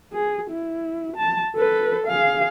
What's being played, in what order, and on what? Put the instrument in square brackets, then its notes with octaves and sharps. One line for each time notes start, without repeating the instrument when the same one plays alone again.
[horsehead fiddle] G#4
E4
A5
A4 B4
G#4 F5